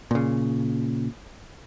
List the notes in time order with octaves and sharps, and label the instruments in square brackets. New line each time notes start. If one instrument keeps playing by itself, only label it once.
[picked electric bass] A#2 C#3